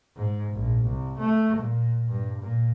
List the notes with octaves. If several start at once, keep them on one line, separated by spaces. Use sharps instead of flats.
G#2
A#1
C2
A3
A#2
G2
A#2